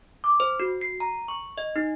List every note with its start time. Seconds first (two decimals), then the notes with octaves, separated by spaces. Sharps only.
0.24 D6
0.40 C5
0.60 F#4
0.81 C7
1.00 A#5
1.28 C#6
1.58 D#5
1.76 D#4